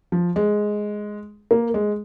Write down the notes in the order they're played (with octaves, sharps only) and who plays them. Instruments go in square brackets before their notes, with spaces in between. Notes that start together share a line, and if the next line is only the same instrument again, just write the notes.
[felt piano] F3
G#3
A#3
G#3